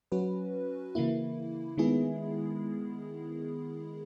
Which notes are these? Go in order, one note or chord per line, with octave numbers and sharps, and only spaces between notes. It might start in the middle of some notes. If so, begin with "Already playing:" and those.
F#3 C#4 F#4 B4
C#3 E3 A#3 E4
D#3 G#3 B3 E4 G#4